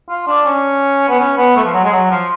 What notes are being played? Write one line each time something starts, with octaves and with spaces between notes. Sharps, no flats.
F4
D4
C#4
B3
C#4
B3
A3
F3
F#3
G#3
F#3
F3